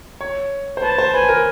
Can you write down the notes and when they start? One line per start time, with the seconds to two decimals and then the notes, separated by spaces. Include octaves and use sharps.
0.21 C#5
0.77 C5
0.82 B4 A5
0.98 C5
1.14 B4 G#5
1.28 A#4